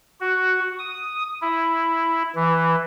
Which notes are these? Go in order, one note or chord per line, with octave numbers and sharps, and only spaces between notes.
F#4
D#6
E4
E3